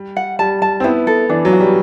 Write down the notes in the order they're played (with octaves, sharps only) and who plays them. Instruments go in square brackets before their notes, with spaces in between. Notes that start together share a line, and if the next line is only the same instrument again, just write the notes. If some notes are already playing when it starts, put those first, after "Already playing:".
Already playing: [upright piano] G3
[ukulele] F#5
[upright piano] G3 [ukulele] A5
[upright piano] G3 [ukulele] A5
[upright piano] C4
[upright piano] B3 [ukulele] E4
[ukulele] A4
[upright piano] E3 [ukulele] D4
[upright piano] F#3
[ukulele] F#4
[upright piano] G3